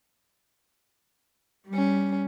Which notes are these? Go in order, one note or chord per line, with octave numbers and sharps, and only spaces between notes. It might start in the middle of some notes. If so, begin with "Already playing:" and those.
G3 C#4